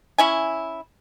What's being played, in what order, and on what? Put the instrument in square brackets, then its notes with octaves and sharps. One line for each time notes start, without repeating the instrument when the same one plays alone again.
[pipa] C#4 E4 G#5